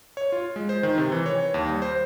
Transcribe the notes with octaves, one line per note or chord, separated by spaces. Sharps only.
C#5
F4
G#3
C5
D#3
C3
E3
C#5
D#2
G3
C5